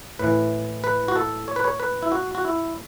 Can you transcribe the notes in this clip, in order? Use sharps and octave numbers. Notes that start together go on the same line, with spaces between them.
A2 E3 B4
B4
F#4
A4
C#5
B4
C#5
B4
E4
F#4
F#4
E4